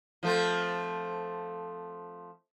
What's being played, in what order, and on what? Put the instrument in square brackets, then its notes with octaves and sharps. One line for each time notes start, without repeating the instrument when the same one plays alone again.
[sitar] F3 A3 C4